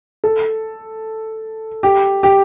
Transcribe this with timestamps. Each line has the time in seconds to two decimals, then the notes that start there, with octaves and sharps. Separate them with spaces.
0.24 A4
1.83 G4
2.23 G4